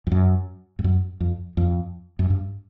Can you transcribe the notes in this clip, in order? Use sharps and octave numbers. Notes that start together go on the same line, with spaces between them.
F2
F#2
G2
F#2
F2
F2
F#2
G2